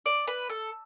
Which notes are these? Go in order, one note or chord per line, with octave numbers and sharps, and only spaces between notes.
D5
B4
A4